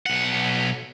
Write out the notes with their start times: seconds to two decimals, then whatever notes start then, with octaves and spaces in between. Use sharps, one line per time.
0.06 B1 F#5